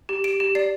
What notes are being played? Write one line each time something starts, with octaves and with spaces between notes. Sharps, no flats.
G4
G4 D7
G4
D5 C7